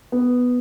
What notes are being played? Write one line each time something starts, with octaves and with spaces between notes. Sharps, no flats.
B3